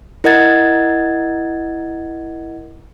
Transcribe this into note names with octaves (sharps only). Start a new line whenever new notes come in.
E4 A#4 D#5 F#5 G#6 A6